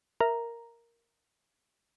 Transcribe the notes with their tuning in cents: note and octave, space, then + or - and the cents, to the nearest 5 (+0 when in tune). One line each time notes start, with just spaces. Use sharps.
A#4 +0 E5 +0 A#5 +0